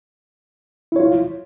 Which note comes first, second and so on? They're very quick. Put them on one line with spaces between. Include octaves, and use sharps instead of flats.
E4 C#5 F4